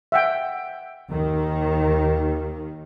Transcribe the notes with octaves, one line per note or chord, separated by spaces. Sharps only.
E5 F#5 G5
D#2 D#3